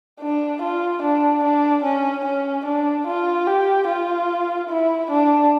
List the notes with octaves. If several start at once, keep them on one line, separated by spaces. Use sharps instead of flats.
D4
F4
D4
D4
C#4
C#4
D4
F4
G4
F4
E4
D4